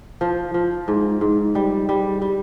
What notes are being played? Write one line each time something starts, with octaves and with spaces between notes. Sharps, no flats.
F3
F3
G#2
G#2
G3
G3
G3